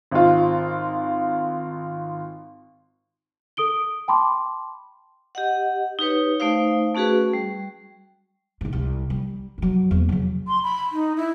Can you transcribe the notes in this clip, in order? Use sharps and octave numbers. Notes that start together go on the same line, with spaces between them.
G#1 F4
A4 D#6 D7 G7
G5 A5 B5 C6 D6
G4 D#5 F#5
D#4 G4 B4 C#5
A3 D#4 C5 F5
A3 C#4 F#4 G#4 B4
G3
C2 G#2
C2
G3
G2 F#3
E2 A#3
C#3 F#3
C6
B5
D#4
E4